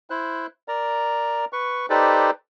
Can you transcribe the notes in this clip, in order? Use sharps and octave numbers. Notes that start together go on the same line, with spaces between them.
E4 C5 F#6
A#4 D5 A#5
B4 C#6
D#4 G4 A4 B4 C5 D5